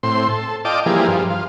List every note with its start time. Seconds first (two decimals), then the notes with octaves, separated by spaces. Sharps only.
0.03 A2 C4 C6
0.29 A4
0.65 F4 D5 D#5 G5 A5 D6
0.86 E3 F3 G3 A#3 G#4
1.07 G2 F3
1.30 F4